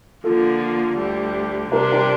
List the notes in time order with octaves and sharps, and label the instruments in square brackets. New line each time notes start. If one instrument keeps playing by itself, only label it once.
[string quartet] D3 F3 A#3 [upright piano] F4 A4
[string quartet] D2 D3 G3
[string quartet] C3 G3 D4 [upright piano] A#4
[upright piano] G4 A#4